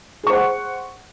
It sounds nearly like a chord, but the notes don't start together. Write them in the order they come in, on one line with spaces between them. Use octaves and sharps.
G#4 C#6 C5 F#5